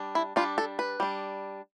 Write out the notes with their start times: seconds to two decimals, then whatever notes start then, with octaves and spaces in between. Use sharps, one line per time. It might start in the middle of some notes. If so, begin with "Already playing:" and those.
Already playing: G3 D4
0.15 E4
0.36 G3 D4 F4
0.58 A4
0.79 B4
1.00 G3 D4